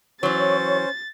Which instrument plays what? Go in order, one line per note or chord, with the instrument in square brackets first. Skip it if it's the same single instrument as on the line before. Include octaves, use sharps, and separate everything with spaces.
[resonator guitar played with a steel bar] E3 F#3 [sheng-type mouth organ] C#4 C5 [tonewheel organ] C#5 [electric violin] A6